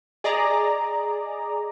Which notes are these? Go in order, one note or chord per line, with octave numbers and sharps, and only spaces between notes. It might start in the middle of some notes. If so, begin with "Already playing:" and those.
G#4 D5 D#5 A#5